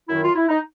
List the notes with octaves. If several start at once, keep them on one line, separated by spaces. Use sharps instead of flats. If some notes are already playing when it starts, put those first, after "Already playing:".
F#2 D#3 F#3 E4
F4
E4
D#4